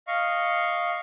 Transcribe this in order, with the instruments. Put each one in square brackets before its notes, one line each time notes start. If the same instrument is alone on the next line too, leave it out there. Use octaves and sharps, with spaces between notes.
[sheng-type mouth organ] D#5 F5 C#6